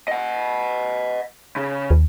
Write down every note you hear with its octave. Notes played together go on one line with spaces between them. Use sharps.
D#5 F#5
C#3
D#2